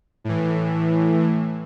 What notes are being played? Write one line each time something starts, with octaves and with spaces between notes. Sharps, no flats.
A2 E3